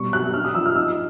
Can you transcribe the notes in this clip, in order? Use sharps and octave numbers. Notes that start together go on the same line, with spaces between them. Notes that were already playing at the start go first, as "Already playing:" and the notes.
Already playing: B2 G3 C#6
F#3 F#6
D4 F6
D#6
F3 E6
F6
D#4 E6